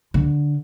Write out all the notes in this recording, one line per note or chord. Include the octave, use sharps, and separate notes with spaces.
D3